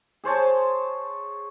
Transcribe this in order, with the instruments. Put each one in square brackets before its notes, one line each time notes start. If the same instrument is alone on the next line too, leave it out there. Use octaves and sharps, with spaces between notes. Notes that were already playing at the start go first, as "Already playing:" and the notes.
[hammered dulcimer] G#4 C5 C#5 A5